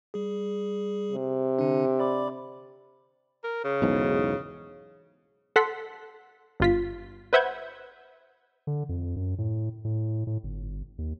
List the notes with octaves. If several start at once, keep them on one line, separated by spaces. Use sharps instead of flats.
G3 G#4
C3
D3 D4
D5 B5 D6
A#4
C#3
B1 E2 G#2
A4 F#5 C6 B6
G1 F4 B6
B4 C5 E5 F#5 G6 G#6
D3
F2
F#2
A2
A2
A2
G1
D#2